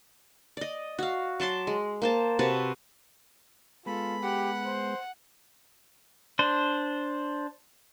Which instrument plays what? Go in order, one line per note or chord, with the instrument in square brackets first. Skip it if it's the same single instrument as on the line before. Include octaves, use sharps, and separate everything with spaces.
[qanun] D5 D#5
F#4 F5
F#3 A5 C6 D6
G#3
A#3 C5 A5
C3 F#4 B4 A5
[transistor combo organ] G#3 B3 [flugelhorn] F4 [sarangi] A4 [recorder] B5
[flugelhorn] G4 [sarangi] F#5
[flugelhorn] C5
[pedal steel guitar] D4 C5